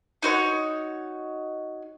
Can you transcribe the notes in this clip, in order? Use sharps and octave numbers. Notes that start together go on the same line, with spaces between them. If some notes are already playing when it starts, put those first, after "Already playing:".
D#4 F#4 C5 C#5